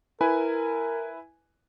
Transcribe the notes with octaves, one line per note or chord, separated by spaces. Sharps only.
E4 A#4 B4 G#5